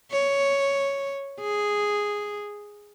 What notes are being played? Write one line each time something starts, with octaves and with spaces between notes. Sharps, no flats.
C#5
G#4